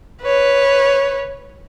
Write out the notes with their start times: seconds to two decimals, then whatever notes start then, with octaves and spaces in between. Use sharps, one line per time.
0.22 B4 C#5